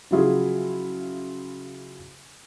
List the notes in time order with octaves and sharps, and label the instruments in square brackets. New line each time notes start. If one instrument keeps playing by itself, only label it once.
[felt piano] C#3 F3 F#3 E4 F4 G#4